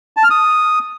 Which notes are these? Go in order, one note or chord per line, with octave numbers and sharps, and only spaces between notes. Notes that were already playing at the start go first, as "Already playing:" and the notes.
A5
F6
D#6